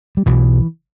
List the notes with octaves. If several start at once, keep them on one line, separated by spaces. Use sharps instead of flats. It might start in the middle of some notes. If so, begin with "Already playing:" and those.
G3
B1 B2 E3